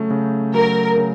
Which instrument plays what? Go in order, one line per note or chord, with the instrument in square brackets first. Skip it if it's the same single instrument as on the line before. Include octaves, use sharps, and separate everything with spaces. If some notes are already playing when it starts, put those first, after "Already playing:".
Already playing: [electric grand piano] C#3 F#3 A3
C#3
[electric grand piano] F#3 [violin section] A#4
[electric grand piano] C#3